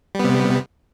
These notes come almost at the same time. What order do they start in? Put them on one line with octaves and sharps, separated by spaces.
G3 B3 C3